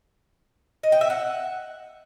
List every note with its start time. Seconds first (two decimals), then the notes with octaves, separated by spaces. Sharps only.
0.83 D#5
0.92 G5
1.01 E5
1.10 F#5